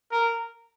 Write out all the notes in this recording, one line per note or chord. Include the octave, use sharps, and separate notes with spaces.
A#4